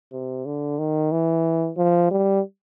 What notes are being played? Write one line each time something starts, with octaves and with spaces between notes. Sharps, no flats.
C3
D3
D#3
E3
F3
G3